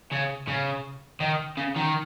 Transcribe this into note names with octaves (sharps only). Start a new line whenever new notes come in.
C#3
C#3
D#3
C#3
D#3